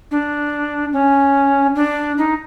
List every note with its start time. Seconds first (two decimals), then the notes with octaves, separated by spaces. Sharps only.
0.11 D4
0.93 C#4
1.75 D4
2.18 D#4